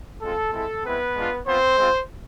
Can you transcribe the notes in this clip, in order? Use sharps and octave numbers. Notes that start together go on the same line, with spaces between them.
G#3 C4 F4 A4
G#3 C4 E4 A4
G#3 B3 C4 E4 B4
G#3 D4 F4
B3 C4 F4 C5
G#3 C4 F4